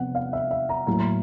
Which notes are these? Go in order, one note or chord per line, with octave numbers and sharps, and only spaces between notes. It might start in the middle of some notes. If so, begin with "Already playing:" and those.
Already playing: C3 F3 B3 F#5
F5
E5
E5
A#5
A2 F#3 A#3 A#5